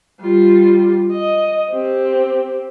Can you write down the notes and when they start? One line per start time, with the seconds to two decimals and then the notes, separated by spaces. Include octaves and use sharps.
0.21 G3 F4
1.12 D#5
1.72 C4 G4